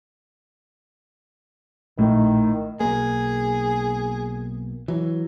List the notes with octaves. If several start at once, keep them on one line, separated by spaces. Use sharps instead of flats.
A#1 A2 D#3
B1 A#3 G#4
E3 F#3